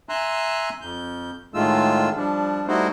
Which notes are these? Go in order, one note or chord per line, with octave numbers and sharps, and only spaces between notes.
E5 G#5 A#5 C6 E6 F#6
F2 G6
A2 D#3 G#3 A3 F4 E6
F3 G3 D4
G3 A3 D#4 E4 F#4 C5